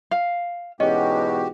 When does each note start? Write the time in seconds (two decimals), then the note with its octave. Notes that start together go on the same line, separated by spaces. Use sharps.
0.11 F5
0.80 E2 G#2 B2 C#4 F#4 G4 D#5